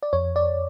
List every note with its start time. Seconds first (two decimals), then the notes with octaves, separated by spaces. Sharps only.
0.03 D5
0.13 F2 C#5
0.36 D5